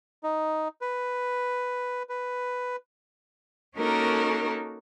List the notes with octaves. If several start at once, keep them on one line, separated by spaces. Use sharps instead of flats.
D#4
B4
B4
A#3 C#4 D#4 F#4 A4 A#4